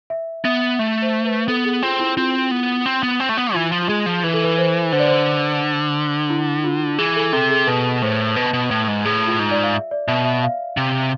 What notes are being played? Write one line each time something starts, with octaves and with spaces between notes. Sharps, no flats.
E5
B3 E5
A3 E5
C5
B4
B3 A4
G#4
C4 F4
E4
C4 F4
B3
C4
B3
C4
A3
B3
E3 F4
F3
F4
G#3 G#4
F3
E3 B4
A4
B4
C5
D3 C5
D5
C5
E4
F4
E3 G#4
A4
C3 A4
G#4
B2 B4
A2 C5
B2 B4
B2
A2
G#2
A2 G#4
F4
G#2
D5
F5
E5
D5
B2 E5
E5
F5
C3